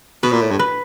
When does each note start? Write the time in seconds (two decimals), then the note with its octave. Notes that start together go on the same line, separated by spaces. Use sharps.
0.23 B2 B4
0.32 A#2
0.42 A2
0.51 G2
0.59 B4